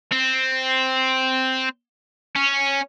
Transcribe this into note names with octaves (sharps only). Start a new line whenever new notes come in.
C4
C#4